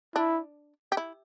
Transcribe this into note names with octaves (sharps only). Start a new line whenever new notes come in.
D4 E4
G4
E4